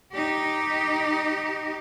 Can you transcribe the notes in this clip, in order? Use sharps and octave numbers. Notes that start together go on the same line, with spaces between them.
D#4 G4